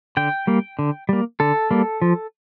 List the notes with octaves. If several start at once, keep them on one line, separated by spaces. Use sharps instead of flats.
D3 G5
G3 A#3
D3
G3 A#3
D3 A4
G3 A#3
F3